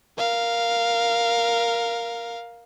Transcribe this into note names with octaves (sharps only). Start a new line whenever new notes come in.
A#4 F5